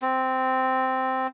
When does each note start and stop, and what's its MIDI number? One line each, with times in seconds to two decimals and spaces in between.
0.02 1.27 60